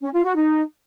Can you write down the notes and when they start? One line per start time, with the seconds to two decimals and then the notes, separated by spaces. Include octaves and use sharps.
0.02 C#4
0.13 F4
0.24 F#4
0.36 D#4